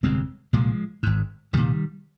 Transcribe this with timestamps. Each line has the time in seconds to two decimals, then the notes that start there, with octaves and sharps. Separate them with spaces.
0.03 G1 F2 C3 G#3 C4
0.53 C2 A#2 F3 G#3
1.03 G#1 G#2
1.53 C2 A#2 D#3 G3